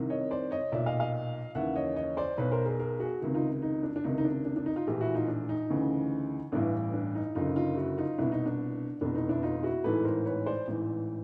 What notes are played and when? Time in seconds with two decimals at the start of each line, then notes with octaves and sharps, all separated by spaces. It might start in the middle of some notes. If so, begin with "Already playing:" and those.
Already playing: C2 C3 D#3
0.10 C#5 D#5
0.31 C5 D5
0.51 C#5 D#5
0.72 B1 A#2 D5 E5
0.86 D#5 F5
1.00 D#5 F5
1.55 D#2 C#3 E3 E5 F#5
1.76 C#5 D#5
1.96 C#5 D#5
2.17 C5 D5
2.38 B1 B2 B4 C#5
2.52 A#4 C5
2.66 G#4 A#4
2.80 G#4 A#4
3.00 F#4 G#4
3.21 C#2 C3 D#3
3.34 D#4 F4
3.62 D#4
3.83 D4
3.96 D4
4.04 C#2 C3 D#3 D#4
4.18 D#4
4.24 D4
4.45 D4
4.56 D4
4.66 D#4
4.76 D#4 F4
4.87 A#1 A2 E3 F4 G4
5.01 E4 F#4
5.14 D#4 F4
5.28 D4
5.49 D#4
5.70 D2 C#3 E3
6.52 A1 G2 E3 D4 E4
6.94 D4
7.15 D#4
7.35 F#1 F#2 D3 D#4 F4
7.56 D#4 F4
7.77 E4 F#4
7.98 D#4 F4
8.18 C2 B2 D4 E4
8.32 D#4
8.46 D4
9.01 F1 E2 B2 D4
9.15 D#4
9.29 D4 E4
9.43 D#4 F4
9.63 E4 F#4
9.84 A1 G#2 E3 A4 B4
10.04 A#4 C5
10.25 B4 C#5
10.46 C5 D5
10.67 A1 G#2 E3